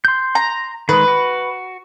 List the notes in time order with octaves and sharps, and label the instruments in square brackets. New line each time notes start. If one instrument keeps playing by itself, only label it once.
[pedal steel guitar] C6 G6
[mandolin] A#5
[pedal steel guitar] D#3 G#3 [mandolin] B4
[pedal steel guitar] F#4